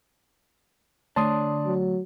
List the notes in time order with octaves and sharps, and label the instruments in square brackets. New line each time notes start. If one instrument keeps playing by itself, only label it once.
[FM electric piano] D3 A3 C#5 [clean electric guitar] D4 [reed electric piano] A5 C6 D#6
[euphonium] F#3